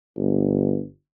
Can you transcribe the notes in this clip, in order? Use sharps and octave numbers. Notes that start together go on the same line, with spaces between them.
G1